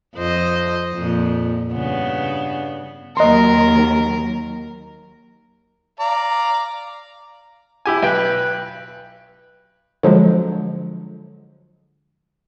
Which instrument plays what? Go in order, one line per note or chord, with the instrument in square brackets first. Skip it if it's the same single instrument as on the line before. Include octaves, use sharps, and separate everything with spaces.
[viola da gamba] F2 C5 D#5
F2 A#2
G2 C#3 B3
[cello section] D#2 D#3 F#3 [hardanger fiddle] A#4 [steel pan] D#5 C6
[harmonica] D5 F5 A#5
[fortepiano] E4 G4 G#5
[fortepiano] B1 G5 [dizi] B4
[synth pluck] D3 F3 F#3 G#3